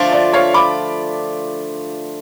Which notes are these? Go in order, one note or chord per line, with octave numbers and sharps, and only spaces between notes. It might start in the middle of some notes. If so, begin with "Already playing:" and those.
Already playing: D3 F3 A3 D4 F4
D5
C#5 F5
B5 D6